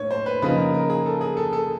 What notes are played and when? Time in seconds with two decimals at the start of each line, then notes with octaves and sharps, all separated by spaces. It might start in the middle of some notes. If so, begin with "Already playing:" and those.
Already playing: A2 A#3 D4 C#5
0.11 C5
0.26 B4
0.42 C#3 F3 A#3 D#4 B4
0.58 A#4
0.74 A#4
0.90 G#4
1.06 A4
1.21 G#4
1.37 A4
1.53 A4